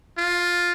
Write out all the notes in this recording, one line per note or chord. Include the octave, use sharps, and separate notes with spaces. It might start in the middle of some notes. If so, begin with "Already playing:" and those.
F4